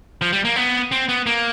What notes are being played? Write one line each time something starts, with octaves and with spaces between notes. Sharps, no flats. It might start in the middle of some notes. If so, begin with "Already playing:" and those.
F3
G3
A#3
B3
C4
B3
A#3